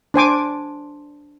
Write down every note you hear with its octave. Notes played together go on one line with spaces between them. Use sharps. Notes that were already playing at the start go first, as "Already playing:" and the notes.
D4 C5 G#5 D6